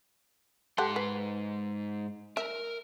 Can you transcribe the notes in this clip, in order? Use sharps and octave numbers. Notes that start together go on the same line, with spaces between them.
G#2 G4 A4 F#5 C6
B4
A#4 E5